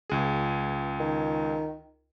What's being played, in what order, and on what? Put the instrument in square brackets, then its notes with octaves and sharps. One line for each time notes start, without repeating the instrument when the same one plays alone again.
[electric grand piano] C#2 G#4
[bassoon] D#3